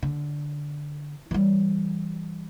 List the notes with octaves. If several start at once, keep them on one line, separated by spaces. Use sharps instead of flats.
D3
E3 G3